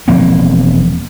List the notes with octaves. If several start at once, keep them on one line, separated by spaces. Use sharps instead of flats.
E1 F3 A#3 C4